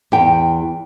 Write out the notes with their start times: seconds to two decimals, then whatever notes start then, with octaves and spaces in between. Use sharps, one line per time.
0.12 E2 G5